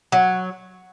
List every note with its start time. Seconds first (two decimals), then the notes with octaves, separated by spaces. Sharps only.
0.12 F#3